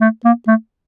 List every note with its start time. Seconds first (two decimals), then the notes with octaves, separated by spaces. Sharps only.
0.01 A3
0.25 A#3
0.47 A3